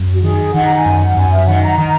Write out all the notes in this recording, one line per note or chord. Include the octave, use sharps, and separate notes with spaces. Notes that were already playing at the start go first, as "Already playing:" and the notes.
Already playing: F#2
F#4
D#3 G#4
D#3 F#5
A#5
G#5
F#2
F#5
F#2 G#5
E5
D#3 F#5
A#5
D#3 A#5